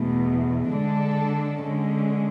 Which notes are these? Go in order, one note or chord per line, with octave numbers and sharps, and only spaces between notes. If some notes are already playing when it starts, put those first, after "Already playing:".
Already playing: E2 B2 A3
D3 G#3 D4 A4
D3 G#3 C#4